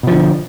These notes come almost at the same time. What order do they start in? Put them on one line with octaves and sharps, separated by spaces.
B2 F3 D3